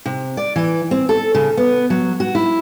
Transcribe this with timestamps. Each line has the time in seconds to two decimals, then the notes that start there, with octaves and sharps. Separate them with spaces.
0.06 C3
0.37 D5
0.56 E3
0.91 C4
1.09 A4
1.35 C#3
1.57 B3
1.90 F#3
2.20 F#4
2.35 E4